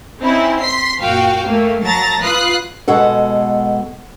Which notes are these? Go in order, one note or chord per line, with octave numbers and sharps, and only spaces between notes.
C4 C#4 D#4 E4
C6 B6 C7
F#2 A#2 F#4 F5 G5
A3 A#3
F#3 A5 A#5 A6 A#6
F4 B4 D#6 F#6 C7
B2 G#3 A4 F#5